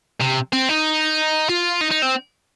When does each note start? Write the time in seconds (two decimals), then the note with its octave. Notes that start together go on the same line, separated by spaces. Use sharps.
0.21 C3
0.53 C4
0.69 D#4
1.49 F4
1.81 D#4
1.91 D#4
2.02 C4